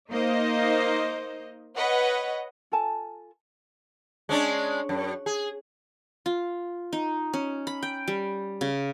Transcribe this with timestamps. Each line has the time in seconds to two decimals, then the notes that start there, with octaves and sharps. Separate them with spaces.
0.10 A#3 D#4 C5 D#5
1.75 B4 C#5 D#5 F#5
2.72 F4 A4 G#5 A5
4.29 G#3 C#4 D4
4.89 F#2
5.26 G#4
6.26 F4
6.93 D#4
7.34 C#4
7.67 B5
7.83 G5
8.08 G3
8.61 C#3